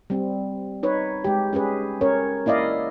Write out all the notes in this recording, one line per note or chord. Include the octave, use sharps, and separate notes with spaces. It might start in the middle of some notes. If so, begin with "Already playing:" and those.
G3 C4
D#4 B4 C#5
G#3 G4
C#4 G4 G#4 B4
C#4 A#4 C#5
A#3 E4 D5 D#5 F5